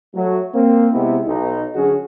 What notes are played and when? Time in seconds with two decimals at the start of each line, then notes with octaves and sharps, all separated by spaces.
0.15 F#3 A3
0.54 A#3 C4
0.93 C3 G#3 B3 E4
1.27 B1 D#4
1.75 G2 D3 F#3 C#4 F#4 G#4